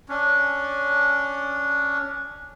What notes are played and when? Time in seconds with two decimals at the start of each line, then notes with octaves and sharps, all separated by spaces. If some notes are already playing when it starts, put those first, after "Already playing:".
0.09 C#4 D4